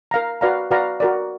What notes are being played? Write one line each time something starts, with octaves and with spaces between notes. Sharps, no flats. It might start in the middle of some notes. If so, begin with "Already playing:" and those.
A#4 F5 A#5
F#4 B4 D5 F5 A#5
F#4 B4 D5 F5 A#5
F#4 A#4 D5